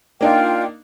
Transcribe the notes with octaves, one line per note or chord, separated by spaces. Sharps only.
A#3 D4 D#4 F4 G5